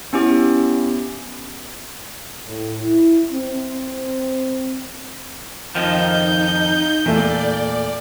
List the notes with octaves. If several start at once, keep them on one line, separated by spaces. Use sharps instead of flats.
B3 C#4 E4 G4
A2
E4
C4
F2 D#3 F3 D#4 G6
E2 A#2 A3 A4 D5